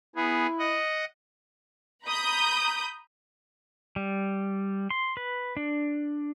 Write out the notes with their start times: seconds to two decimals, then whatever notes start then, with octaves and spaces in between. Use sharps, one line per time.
0.16 B3 E4 G#4
0.59 D#5 F#5
2.05 A#5 B5 D#6 G6
3.96 G3
4.90 C6
5.17 B4
5.57 D4